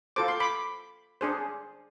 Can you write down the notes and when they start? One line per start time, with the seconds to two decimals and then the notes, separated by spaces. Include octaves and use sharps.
0.16 F4 A4 C5 D6
0.28 C6
0.40 B5 D6
1.21 D4 G#4 C5